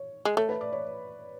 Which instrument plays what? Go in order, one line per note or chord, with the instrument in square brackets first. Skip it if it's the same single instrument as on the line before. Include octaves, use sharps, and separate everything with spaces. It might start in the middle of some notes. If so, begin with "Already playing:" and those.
Already playing: [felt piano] C#5
[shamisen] G#3
[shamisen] A3 [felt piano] C#5
[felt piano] B4
D5
C#5